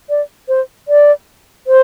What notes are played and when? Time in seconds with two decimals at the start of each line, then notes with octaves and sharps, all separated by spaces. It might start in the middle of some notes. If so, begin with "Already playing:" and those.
0.10 D5
0.48 C5
0.88 D5
1.67 C5